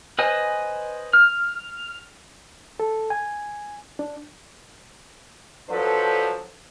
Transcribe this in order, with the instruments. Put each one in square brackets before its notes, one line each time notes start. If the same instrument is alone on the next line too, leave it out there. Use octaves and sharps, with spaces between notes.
[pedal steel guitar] B4 C5 D#5 G#5
F6
[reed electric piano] A4
G#5
D4
[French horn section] F3 F#3 D4 A4 B4 C5